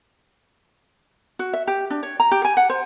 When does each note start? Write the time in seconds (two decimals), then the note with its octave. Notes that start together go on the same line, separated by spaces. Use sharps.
1.39 F#4
1.53 E5
1.67 G4
1.90 D4
2.03 C#5
2.20 A#5
2.31 G4
2.44 G#5
2.57 F#5
2.70 C5